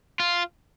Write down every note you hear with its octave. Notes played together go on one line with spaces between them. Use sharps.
F4